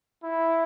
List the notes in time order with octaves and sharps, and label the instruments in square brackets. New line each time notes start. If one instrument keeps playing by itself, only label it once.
[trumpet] E4